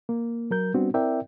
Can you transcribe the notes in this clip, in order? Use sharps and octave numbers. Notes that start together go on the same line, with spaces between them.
A#3
F#3 A#4 G6
G3 B3 C4 D4 F#4
C4 E4 A#4 D5 E5 G5